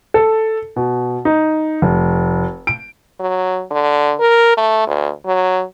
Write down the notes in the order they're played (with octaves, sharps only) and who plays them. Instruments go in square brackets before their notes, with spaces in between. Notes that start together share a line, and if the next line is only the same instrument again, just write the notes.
[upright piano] A4
B2
D#4
F1
D7
[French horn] F#3
D3
A#4
A3
D2
F#3